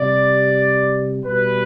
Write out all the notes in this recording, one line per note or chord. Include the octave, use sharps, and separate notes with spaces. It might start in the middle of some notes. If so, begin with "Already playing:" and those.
Already playing: C3 G3 D5
B2 G3 B4